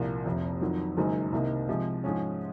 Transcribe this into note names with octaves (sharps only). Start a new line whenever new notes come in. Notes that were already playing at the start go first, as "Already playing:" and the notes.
Already playing: C2 A#2 F3 A#3
F1 F2 C3
F2 D#3 F#3
F#1 F#2 D#3 G#3
C2 C3 D#3 A#3 D#4
C3 F3 G#3
G#2 F3 G#3 C#4